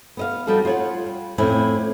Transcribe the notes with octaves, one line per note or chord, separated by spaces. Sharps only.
B3 D#5 F5
F3 G3 D#4 F#4 A4
F4 C#5 F#5
G3
F2 A2 C4 C#4 E4